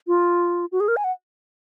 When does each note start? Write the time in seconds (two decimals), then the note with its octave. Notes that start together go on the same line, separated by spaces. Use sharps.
0.07 F4
0.72 F#4
0.80 G#4
0.88 A#4
0.97 G#5
1.04 F#5